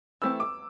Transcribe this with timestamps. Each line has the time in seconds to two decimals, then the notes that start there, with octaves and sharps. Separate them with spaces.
0.22 E3 A3 C4 G4 E6
0.40 D6